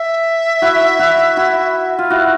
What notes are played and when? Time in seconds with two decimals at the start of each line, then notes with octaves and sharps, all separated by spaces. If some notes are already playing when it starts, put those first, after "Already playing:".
Already playing: E5
0.62 E4 F#4
0.99 E4 F#4
1.37 E4 F#4
1.99 F4
2.10 E4 F#4